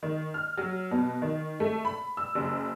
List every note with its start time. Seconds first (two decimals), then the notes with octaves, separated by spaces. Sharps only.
0.03 D#3
0.34 F6
0.58 F#3
0.91 B2
1.22 D#3
1.60 A3
1.85 B5
2.17 E6
2.35 F#1